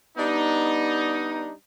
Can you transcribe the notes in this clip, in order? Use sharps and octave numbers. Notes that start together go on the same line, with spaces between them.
G3 B3 D4 D#4